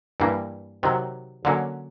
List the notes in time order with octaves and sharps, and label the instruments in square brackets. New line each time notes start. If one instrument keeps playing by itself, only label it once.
[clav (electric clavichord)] G2 E3 G3 A#3
C3 D#3 F#3
D3 F#3 A#3 C#4